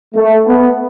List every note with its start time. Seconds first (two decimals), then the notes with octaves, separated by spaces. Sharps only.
0.15 A3
0.46 B3